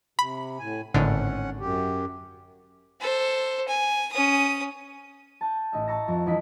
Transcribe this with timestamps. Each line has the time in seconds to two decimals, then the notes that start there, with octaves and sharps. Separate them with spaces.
0.19 C3 B5
0.59 A2 G#5
0.94 G#1 A2 D3 C#4 F#5
1.60 F#2 G4
3.00 A4 C5
3.68 G#5
4.12 C#4 D#6
5.41 A5 G6
5.73 A1 D#5 E5
5.87 A5 A#5 C#6 E6 A#6
6.08 F2
6.26 E1 E4 D#5 B6